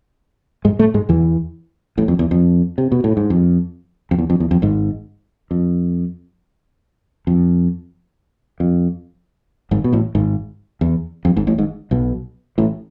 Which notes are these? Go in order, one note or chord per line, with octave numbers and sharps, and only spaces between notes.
G#2 G#3
A2 A3
G#2 G#3
E2 E3
A1 A2
F2
E2
F2
C3
B2
A2
G#2
F2
F2
E2
F2
E2
F2
G#1 G#2
F2
F2
F2
G#1 G#2
B2
A1 A2
G#1 G#2
E2
F2
G#1 G#2
A1 A2
G#1 G#2
B1 B2
A1 A2